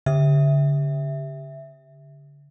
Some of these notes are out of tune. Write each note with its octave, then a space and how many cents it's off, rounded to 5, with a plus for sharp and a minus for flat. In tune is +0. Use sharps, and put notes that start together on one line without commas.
D3 -40 E5 +0